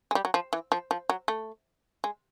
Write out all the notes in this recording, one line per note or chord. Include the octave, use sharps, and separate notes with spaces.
G#3
G3
F#3
F3
E3
F3
F3
F#3
A3
G#3